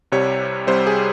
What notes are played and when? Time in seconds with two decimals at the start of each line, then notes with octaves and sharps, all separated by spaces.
0.12 C2 C3 G3 C#5
0.67 C2 C3 G3 C5
0.87 G#4